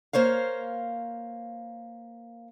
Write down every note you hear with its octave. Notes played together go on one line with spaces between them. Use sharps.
A#3 C5 C#5 F5